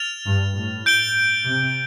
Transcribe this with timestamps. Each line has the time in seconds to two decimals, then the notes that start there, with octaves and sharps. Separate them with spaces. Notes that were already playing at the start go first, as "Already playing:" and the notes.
Already playing: F6 A6 F7
0.26 G2
0.56 A2
0.86 G6 D7 G7
1.45 C3